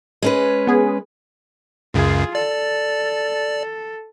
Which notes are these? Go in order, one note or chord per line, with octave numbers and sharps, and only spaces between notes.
G#3 C#4 B4
B3 G#4
C#2 F#2 C#3 F4 G#4
A4 D5